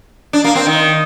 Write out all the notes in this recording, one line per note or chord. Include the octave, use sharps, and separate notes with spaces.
D4
A#3
C4
D#3